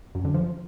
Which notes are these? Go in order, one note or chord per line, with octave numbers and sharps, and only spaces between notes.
F#2
D3
F3